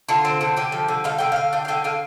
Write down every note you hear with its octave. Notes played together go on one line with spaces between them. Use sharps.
D3 F4
C4
D3
D3 G4
F3
D3
G3 F5
D3 G5
D3 F5
D4 G5
F5
D3 G5
D3 F5